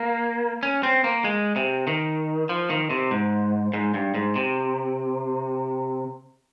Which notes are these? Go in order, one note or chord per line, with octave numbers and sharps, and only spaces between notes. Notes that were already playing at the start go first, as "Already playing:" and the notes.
Already playing: A#3
C#4
C4
A#3
G#3
C3
D#3
F3
D#3
C3
G#2
G#2
G2
G#2
C3